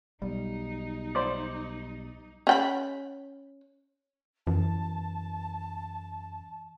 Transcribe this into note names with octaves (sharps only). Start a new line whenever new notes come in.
B1 G3 D#4
C5 D5
C#4 G5 B5
F#2 E3 A5